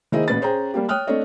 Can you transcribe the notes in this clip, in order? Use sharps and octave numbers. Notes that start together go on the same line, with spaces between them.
D#3 A#3 E4 G#4 C5 D#5
A1 A#2 B4 A6
C#4 G#4 C5 G5 A#5
G3 A#3 G4
C#5 G5 D#6 F6 F#6
A3 C4 D4 C#5 D#5